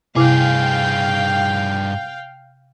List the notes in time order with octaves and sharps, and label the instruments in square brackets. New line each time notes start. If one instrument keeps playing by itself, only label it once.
[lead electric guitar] G2 G#4 [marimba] C3 E4 D6 [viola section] F5 G5